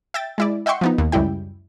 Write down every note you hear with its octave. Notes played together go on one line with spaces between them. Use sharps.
E5 G5 A6
G#3 E4 D5
D#5 E5 F#5 G5 C6 C#6
F3 B3 D#4
D#2
C#2 F#2 G3 E4 G5